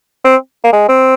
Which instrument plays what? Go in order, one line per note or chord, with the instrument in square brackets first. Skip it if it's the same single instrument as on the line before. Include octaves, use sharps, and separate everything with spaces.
[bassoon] C4
A#3
G#3
C4